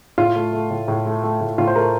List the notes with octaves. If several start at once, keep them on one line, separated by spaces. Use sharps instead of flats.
A2 F4
A3
A3
A2
A2
A3
A3
A2
A2 F4
C5
A3 A#4